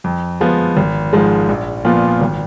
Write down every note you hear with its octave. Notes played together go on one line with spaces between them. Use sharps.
F2
F3 G#3 B3 F4
G#1
G#2 F3 G#3
A#1
A#2 F3 B3 F4
G#1